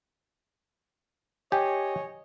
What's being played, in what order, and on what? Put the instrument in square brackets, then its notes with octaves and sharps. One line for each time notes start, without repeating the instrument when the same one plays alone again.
[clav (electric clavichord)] G4 [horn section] C#5 D#5 [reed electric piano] G#5